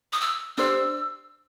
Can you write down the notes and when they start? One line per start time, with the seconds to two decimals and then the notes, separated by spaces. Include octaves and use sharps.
0.13 D#6
0.21 E6
0.58 D4 G4 C5 E6